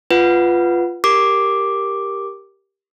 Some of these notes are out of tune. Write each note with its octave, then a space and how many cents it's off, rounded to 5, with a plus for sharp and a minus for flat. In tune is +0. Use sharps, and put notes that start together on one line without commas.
F4 -5 B4 +0 F#5 +0
G4 +0 A#4 +0 D6 +0